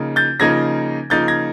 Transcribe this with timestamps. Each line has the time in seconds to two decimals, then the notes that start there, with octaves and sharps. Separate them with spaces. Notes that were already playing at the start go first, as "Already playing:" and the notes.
Already playing: C#3 F3 A#3 D#4
0.16 G6 A6
0.40 C#3 F3 A#3 D#4 G#6 A#6
1.10 C#3 F3 A#3 D#4 G6 A6
1.28 G#6 A#6